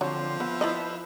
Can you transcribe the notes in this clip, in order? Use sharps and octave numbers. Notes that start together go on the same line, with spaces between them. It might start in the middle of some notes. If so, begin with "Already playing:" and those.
D3 F3 F#3 C4 C#5
B3 B4 E5
E4 D5 D#5